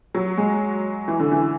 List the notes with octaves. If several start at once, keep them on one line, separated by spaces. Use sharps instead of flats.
F#3
G#3
E3
D3
E3